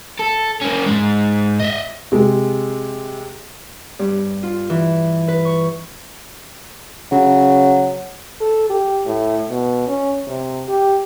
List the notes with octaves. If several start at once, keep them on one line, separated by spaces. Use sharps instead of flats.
A4
A#3 C#4
G#2 G#3
D#5 E5
C3 G#3
G2
F4
E3
B4
C#6
C#3 F#3
A4
G4
A2
B2
C#4
C3
G4